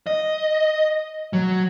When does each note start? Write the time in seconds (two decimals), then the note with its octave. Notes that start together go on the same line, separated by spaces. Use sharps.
0.07 D#5
1.33 F#3